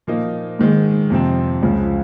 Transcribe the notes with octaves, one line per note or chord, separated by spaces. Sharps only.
A#2 F3 A#3 D#4
G#2 D#3 G#3
F2 C3 F3 C4
C#2 C#3 F3